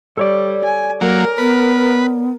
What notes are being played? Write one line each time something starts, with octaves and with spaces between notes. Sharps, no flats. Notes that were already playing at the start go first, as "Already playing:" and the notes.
G3 A4 C#5 D5
G#5
F#3 A#3 A#4
B3 B4